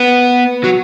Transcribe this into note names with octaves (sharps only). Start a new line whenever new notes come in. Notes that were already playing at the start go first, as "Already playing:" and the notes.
Already playing: B3
F#3